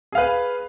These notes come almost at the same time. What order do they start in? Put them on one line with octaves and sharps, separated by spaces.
G#4 F5 B4